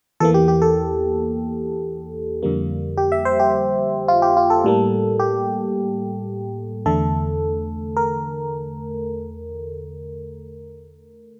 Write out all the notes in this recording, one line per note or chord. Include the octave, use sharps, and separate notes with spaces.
E2 E3 A#3 A4
G4
G4
A4
F2 D3 G3 A#3
G4
E5
C5
G4
F4
G4
F4
A4
A2 G3 A#3
G4
E2 D3 A3 A4
A#4